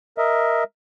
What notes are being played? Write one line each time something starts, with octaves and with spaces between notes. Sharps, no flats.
A#4 D#5 E5